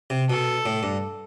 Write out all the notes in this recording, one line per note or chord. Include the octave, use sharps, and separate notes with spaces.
C3
B2 A4
A2
G2